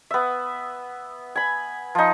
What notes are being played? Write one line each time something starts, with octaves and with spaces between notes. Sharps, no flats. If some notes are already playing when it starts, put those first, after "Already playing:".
B3 E5
G#5 B5
F3 D#4